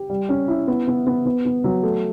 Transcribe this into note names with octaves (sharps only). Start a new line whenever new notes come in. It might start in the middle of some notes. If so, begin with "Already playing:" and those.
Already playing: G4
G3
C#4
E4
B3
B3
B3
B3
B3
F#3
A3